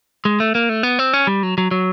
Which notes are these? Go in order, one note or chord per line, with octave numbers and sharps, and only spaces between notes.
G#3
A3
A#3
A3
B3
C4
C#4
G3
F#3
F#3
F#3